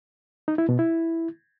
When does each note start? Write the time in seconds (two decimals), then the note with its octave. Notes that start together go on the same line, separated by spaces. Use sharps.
0.48 D#4
0.58 E4
0.69 B2
0.79 E4